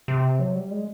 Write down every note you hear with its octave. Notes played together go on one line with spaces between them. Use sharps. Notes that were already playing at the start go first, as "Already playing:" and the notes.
C3
F#3
G3
G#3